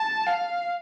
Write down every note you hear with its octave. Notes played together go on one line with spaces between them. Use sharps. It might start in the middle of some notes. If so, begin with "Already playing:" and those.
Already playing: A5
F5